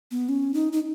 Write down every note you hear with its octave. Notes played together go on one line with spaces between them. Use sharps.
B3
C#4
D#4
D#4